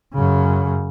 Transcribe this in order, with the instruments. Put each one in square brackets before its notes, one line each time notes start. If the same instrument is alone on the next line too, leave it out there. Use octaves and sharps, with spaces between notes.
[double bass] F#2 C#3